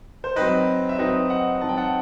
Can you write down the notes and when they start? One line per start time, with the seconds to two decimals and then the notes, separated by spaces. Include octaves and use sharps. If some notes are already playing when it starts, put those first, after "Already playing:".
0.24 C5
0.36 F#3 C4 D#4 B4 D#5
0.89 E5
0.98 F#3 C4 D#4 B4 D#5
1.30 D#5 F#5
1.61 F#3 C4 D#4 A5
1.69 G5
1.77 F#5 A5